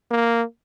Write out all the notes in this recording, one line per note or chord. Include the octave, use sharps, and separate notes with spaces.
A#3